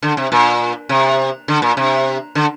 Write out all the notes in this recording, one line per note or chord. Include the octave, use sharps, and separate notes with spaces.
D3
C3
A#2
C3
D3
A#2
C3
D3